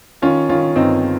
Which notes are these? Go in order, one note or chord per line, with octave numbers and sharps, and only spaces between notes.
D#3 C#4 F4
D#3 C#4 F4
G1 C4 D#4